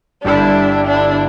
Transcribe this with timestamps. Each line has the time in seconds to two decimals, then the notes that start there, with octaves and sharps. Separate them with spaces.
0.24 G1 G2 D3 G3 D4 E4
0.87 D4